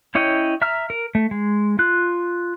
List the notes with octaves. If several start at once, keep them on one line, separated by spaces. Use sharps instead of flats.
C#4 E4 C#5 D#5 G5
E5 A#5 E6 F6
A#4
A3
G#3
F4 F#6